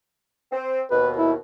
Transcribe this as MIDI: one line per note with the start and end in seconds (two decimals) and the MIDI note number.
0.52 0.81 60
0.91 1.35 39
0.91 1.35 47
0.91 1.09 71
1.17 1.32 64